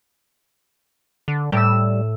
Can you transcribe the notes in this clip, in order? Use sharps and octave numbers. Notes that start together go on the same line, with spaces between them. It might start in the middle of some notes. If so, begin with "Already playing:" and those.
D3
A2 G3 E6